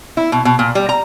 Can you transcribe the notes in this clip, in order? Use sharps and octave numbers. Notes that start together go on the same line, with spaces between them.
E4
B2
B2
A#2
G3
A#5